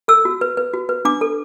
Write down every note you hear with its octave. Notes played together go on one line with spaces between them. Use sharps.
A4 E6
F#4
B4
B4
F#4
B4
D4 D6
A4